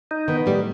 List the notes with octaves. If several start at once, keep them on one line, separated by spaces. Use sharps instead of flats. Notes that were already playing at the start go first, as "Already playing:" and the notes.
D#4
D#3 B3
A2 G3